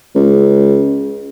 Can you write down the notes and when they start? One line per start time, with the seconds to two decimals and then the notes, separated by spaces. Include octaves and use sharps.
0.15 C#2